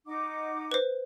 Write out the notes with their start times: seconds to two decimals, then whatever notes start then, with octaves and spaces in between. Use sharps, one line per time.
0.07 D#4 F#5 D6
0.72 B4 C5